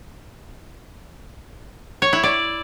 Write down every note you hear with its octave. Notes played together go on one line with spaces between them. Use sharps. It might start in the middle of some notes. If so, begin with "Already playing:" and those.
C#5
E4
D5